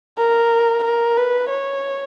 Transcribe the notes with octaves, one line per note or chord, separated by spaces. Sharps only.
A#4
A#4
B4
C#5